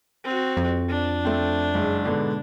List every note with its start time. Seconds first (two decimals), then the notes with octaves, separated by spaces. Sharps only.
0.24 C4 F#4
0.57 F2
0.89 D4
1.25 A3 C4
1.74 F#1 G#3
2.05 G#2 B2 D3